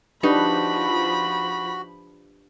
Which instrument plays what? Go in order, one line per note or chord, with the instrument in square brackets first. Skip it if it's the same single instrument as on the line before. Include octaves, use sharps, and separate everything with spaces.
[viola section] F3 B5 [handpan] D4 G4 B4 [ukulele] D#4 [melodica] F#4